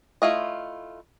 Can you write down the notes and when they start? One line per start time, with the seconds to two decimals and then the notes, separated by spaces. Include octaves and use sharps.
0.22 A3 E4 F4 D#5